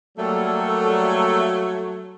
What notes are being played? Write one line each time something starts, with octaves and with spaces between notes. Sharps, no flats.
F#3 G3 A3 A#3 A4